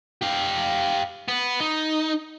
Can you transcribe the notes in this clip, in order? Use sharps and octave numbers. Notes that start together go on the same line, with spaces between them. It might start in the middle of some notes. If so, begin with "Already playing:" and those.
G4 F5
B3
D#4